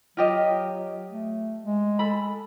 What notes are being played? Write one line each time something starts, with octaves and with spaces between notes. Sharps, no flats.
F#3 F4 G4 D#5
A3
G#3
A4 B5